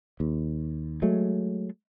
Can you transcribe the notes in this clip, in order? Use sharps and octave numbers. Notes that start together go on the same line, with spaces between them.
D#2
F#3 G#3 A3